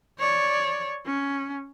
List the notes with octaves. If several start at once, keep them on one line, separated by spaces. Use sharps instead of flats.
C#5 D5
C#4